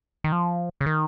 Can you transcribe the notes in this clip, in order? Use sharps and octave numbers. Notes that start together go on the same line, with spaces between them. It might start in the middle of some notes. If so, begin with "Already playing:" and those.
D#3
F3
C#3
D#3